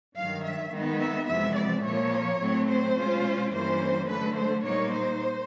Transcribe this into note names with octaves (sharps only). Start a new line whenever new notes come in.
G2 D#3 F#3 F5
E5
D#3 G#3 B3 D#4
E5
F2 C3 E3 G#3 B3 E5
D5
A#2 F3 A#3 C#5
A2 F#3 A3 C4
C5
B2 G#3 C#4 F4
G2 E3 G3 A#3 C#4 C5
D3 F#3 A3 B4
C5
A#2 G3 A#3 D#4 C#5
C5